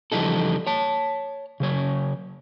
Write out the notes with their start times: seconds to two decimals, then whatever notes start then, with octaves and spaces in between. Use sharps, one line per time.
0.12 C#3 E3 F3 G3 D#4 A4
0.67 C#5 A5
1.60 C#3 F#3 C#5